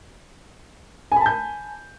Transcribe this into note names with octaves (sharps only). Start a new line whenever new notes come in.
G#5 A5 B5 G6